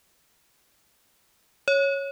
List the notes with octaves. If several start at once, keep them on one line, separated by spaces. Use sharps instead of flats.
C#5